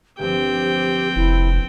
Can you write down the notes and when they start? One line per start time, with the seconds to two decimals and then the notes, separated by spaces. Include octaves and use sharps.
0.19 G1 F3 C4 G4 G5
1.16 F1 E4